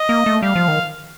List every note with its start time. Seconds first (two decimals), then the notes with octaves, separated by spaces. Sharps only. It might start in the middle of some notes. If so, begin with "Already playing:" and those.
Already playing: D#5
0.09 A#3
0.26 A3
0.43 G3 F5
0.56 F3
0.68 D#3